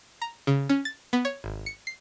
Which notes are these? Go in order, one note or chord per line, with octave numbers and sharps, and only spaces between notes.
A#5
C#3
C#4
A6
B3
C#5
G#1
C#7
C7